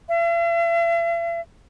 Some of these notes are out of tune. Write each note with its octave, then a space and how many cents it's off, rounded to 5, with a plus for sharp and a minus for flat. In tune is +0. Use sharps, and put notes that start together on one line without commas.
E5 +45